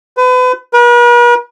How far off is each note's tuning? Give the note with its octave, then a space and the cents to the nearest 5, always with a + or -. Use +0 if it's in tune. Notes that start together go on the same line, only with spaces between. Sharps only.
B4 +35
B4 -45